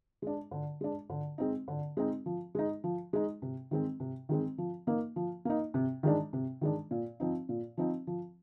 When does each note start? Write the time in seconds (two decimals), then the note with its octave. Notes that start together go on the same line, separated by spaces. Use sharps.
0.22 G#3 D4
0.51 D3
0.81 G#3 D4
1.10 D3
1.38 G#3 C4 D#4
1.68 D3
1.97 G#3 C4 D#4
2.26 F3
2.55 G#3 D#4
2.84 F3
3.13 G#3 D#4
3.42 C3
3.71 D#3 G#3 C4
4.00 C3
4.29 D#3 G#3 C4
4.58 F3
4.87 A#3 D#4
5.16 F3
5.45 A#3 D#4
5.74 C3
6.03 D#3 G#3 D4
6.33 C3
6.61 D#3 G#3 D4
6.91 A#2
7.20 F3 C4 D#4
7.49 A#2
7.77 F3 C4 D#4
8.07 F3